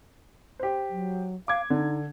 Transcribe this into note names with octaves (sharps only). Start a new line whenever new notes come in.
G4 C5
F#3
F5 D6 G#6
D3 D#4